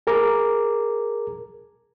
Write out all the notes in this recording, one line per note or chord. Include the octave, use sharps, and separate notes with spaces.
G#4 A#4 D6